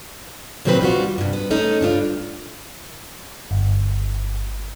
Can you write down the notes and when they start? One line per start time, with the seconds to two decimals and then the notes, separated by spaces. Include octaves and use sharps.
0.65 A#2 D#3 F#3 C4 A4 B4
0.81 G3 F4 F#4
1.18 G2 C3
1.33 B3
1.50 A3 C#4 D#4 A4
1.81 G2 D4 F4
3.51 G1